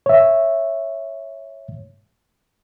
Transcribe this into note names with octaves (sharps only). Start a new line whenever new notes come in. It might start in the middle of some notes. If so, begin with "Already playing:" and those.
C#5 E5